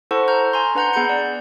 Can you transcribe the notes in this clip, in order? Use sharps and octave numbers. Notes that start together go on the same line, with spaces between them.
E4 A4 C5 F#5 A5 C#6
A#5 F6 G6
G#5 A#5 C6
D4 B4 F#5 A#5 G6 C#7
B3 G#4 B5 G6 C#7
D5